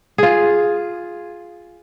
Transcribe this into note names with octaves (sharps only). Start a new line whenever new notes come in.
F4 G#4